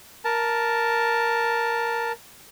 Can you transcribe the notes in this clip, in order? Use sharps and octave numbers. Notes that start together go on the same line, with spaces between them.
A#4 A5